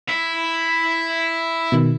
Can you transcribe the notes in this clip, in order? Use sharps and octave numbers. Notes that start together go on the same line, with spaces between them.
E4
B2 D#3